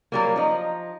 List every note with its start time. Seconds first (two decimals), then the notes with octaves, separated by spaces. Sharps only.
0.12 F#3 G3 A#3
0.36 F3 D#4